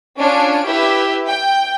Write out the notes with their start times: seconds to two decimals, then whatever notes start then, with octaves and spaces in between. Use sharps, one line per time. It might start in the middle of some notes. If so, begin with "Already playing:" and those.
0.18 C#4 D4 F4 C#5 D7
0.67 E4 G4 B4 E5
1.28 G5